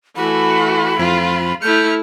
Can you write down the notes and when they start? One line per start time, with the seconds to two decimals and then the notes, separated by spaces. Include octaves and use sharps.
0.16 E3 A3 F#4 B5
0.99 F2 F3 F4
1.62 A3 E4 F6 G6 C#7